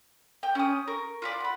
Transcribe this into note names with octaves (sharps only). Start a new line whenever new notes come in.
G5
C#4 D#6
A#4 C#6
F4 B4 D5
F#5 B5